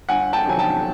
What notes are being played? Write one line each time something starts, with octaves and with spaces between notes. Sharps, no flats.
G1 F#5 G#5
G5 A5
F2 C3 D#3 F#3 G#5
G5 A5